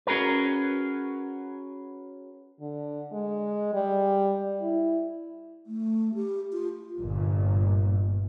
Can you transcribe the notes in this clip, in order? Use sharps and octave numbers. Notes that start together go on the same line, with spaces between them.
C#4 F#4 G#4 A#4 B4
D3
G#3
G3
E4
A3
G4
F4
G1 A#2